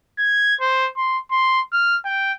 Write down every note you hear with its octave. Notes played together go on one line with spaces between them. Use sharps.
G#6
C5
C6
C6
F6
G5